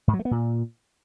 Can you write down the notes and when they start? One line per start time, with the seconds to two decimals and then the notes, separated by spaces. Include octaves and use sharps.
0.08 G#2
0.13 F#3
0.19 A3
0.25 B3
0.31 A#2